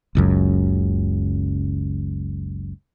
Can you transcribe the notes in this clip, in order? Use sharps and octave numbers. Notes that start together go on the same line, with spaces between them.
F#1 C#2 F#2